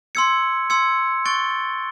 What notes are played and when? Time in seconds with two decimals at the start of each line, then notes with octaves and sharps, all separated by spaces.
0.15 C6 E6 G#6 C#7
0.70 C6 E6 G#6 C#7
1.25 C#6 F#6 A6 D7 G7